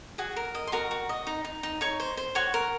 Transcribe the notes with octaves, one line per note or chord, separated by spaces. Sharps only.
F#4 G#4 G#5
A#4
D#5
C6
F#4 A#4 A#5
F#4
D#5
D#4
D#4
D#4
D#4 C#5 C#6
C5
C5
F#4 C#5 C#6
A#4